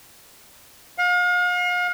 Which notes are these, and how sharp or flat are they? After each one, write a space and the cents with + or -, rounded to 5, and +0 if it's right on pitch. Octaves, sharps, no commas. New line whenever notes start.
F5 +40